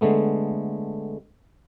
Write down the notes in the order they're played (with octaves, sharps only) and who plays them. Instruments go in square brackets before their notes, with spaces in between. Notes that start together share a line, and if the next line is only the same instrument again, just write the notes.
[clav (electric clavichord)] D3 G#3 A3 B3